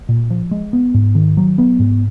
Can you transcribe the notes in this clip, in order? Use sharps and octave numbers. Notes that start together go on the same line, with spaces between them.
A#2
F3
G#3
B3
G#2
D#3
F#3
B3
G#2